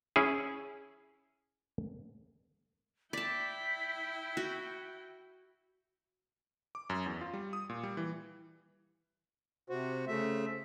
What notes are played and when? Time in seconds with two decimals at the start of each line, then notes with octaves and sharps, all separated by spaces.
0.16 C#4 E4 G#4
3.13 E4 D5 G5 A5 B6
4.37 F#4
6.75 D6
6.90 F#2
7.06 E2
7.21 F4
7.34 G3
7.53 D#6
7.69 A#2
7.83 G3
7.97 E3
9.70 C3 F#4 C5
10.07 C#3 A3 E5